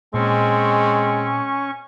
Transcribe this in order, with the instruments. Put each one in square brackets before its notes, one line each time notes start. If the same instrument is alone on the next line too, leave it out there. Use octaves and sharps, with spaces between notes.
[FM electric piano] A#2 [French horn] G#3 [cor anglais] C4 [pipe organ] C#4 C#6